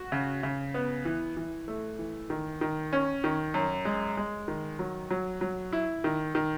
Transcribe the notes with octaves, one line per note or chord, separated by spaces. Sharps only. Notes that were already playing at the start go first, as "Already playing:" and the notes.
Already playing: F#4
C#3
C#3
B3
E3
E3
A3
E3
D#3
D#3
C#4
D#3
F#2
G#3
G#3
D#3
F#3
F#3
F#3
E4
D#3
D#3